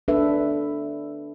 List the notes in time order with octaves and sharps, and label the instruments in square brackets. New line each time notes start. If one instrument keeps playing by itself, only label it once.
[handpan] D4 A4 B4 E5